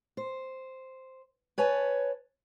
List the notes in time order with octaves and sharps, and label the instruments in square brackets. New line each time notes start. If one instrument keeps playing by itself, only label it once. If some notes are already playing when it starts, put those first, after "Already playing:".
[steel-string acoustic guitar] C5
B4 C#5 G#5 A5